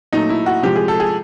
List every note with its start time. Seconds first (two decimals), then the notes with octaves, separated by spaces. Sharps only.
0.13 A#2 F#3 A3 D#4
0.30 E4
0.46 F#4
0.62 C3 F3 G#3 G4
0.76 G#4
0.88 A4
1.00 G#4